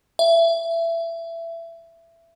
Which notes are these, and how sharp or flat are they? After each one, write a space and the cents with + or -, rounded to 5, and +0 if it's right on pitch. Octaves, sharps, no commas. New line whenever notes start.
E5 +20